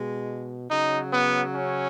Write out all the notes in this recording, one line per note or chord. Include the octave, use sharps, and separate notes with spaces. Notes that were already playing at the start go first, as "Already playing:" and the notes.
Already playing: B2 G#3
C#3 F#3 D#4
B3
C#4